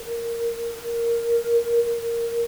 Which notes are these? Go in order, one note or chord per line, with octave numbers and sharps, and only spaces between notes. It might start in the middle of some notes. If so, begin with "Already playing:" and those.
Already playing: A#4
A#4
A#4